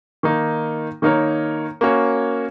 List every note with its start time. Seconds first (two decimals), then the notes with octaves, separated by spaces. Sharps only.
0.23 D#3 A#3 D#4
1.02 D#3 A#3 D#4 A#4 C#5
1.81 A#3 C#4 F#4 C#5